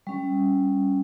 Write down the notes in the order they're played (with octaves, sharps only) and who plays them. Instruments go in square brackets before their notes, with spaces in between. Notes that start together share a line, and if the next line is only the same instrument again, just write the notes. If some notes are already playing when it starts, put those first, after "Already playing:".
[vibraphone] G3 C#4